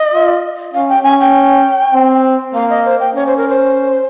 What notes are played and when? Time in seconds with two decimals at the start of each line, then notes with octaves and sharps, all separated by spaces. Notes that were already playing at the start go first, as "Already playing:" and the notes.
Already playing: D#5
0.14 F4
0.74 C#4 F5
0.89 G5
1.04 C#4 G#5
1.20 G5
1.94 C4
2.54 A#3 F5
2.70 D#5
2.85 C5
3.00 G5
3.15 C#4 C#5
3.27 C5
3.37 A#4
3.49 C5